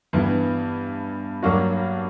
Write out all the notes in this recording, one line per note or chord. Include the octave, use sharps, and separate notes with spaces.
G2 E3 B3
G2 F#3 A#3 D4 F#4